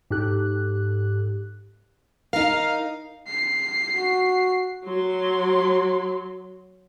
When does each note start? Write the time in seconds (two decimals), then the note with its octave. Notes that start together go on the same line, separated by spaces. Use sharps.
0.10 G#2 G4 A4 F#6
2.33 D#4 A#4 F5
3.28 C7
3.93 F#4
4.85 F#3 C6